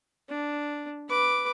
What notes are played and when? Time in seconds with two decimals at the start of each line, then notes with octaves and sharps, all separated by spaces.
0.29 D4
1.09 B4 D6